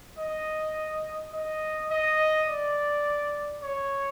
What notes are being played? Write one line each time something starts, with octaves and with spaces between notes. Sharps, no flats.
D#5
D#5
D#5
D5
C#5